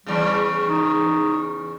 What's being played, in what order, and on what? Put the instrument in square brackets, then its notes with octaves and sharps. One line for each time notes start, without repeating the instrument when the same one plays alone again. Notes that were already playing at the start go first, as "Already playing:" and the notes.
[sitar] E2 C#3 [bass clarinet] G3
[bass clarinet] D#4